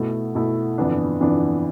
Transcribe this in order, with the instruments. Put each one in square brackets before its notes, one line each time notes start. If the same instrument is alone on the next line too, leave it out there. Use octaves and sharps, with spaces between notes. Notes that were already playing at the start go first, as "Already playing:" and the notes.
Already playing: [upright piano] B2 A3 E4
B2 A3 E4
G1 F2 E3 B3 D4
G1 F2 E3 B3 D4